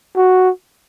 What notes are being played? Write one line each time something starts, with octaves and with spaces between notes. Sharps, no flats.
F#4